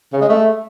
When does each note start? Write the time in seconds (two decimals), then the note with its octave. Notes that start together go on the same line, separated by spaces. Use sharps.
0.13 C#3
0.21 G#3
0.29 A3